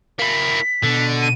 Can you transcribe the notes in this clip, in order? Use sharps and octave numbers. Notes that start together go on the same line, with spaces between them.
A#3 E4 B6
B2 D3
D#7